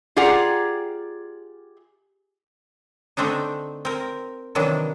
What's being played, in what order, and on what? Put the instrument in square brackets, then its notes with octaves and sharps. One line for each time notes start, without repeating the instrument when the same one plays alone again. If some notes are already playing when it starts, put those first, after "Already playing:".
[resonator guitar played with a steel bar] F4 G4 G#4 D5 F#5 A#5
[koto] D3 A3 C4 D4 D#4
C4 A#4
C3 D#3 E3 F#3 D4